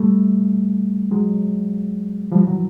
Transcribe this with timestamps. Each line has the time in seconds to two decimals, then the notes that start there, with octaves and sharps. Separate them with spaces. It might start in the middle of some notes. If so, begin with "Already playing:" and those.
Already playing: G3 A3
1.11 F#3 G#3
2.32 F3 G3
2.47 E3 F#3